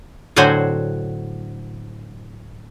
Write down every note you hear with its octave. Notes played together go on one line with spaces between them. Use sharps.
A2 D3 F#3 F#4 C5 G#5